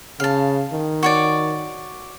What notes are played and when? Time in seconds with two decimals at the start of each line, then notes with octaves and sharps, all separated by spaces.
0.20 C#3 F5 A5
0.72 D#3
1.03 F#4 C#5 D5